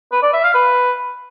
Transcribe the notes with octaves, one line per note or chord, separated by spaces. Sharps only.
B4
D5
E5
F5
B4